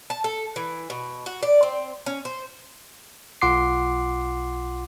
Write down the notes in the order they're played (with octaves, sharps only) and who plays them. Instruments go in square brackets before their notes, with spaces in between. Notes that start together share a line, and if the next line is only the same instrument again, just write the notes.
[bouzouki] A5
A4
E3
B2
F#4
D5
C4
C#4
C5
[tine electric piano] B1 F4 F#5 C6 D6 C7